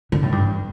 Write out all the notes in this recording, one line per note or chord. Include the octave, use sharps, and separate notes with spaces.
D3
A2
G2
E2